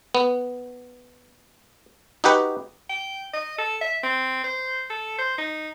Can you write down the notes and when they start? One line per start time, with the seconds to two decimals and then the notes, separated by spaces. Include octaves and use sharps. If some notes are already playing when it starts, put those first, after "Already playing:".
0.15 B3
2.24 D#4 F#4 G4 B4 F#5
2.89 G5
3.33 D#5
3.58 A4
3.81 E5
4.03 C4
4.44 C5
4.90 A4
5.18 C5
5.38 D#4